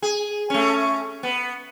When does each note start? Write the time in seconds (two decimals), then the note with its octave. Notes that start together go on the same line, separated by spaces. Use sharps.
0.02 G#4
0.50 A3 C#4
1.23 B3